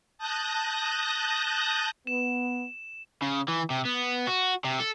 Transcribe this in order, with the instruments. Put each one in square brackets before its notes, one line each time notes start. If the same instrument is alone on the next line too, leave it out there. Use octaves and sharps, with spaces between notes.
[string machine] A5 D#6 F#6 G6 A#6
[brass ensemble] B3 [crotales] E7
[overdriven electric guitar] C#3
E3
C3
B3
F#4
C3
A4